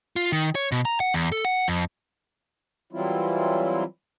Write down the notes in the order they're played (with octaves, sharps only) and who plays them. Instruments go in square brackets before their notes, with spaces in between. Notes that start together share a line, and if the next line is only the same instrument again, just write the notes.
[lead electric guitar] F4
D#3
C#5
B2
A#5
F#5
E2
A4
F#5
F2
[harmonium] E3 F#3 G3 C4 E4 F4